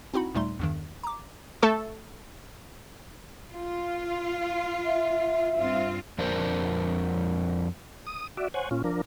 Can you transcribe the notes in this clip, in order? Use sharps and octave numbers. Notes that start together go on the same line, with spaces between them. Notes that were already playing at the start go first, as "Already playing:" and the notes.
C4 D#4 E4 F#4 F#5 B5
D#2 A#2 G3 A3 D#4 C6
E2 G2 D#3
A#5 D6
A3 A4 C#6
F4
E5
G2 C4 F4
F2 D4 A#4 C5
D#6
F#4 D5 E5
C5 C#5 F#5 G#5
A#2 C#4 F4
F3 D4 A#4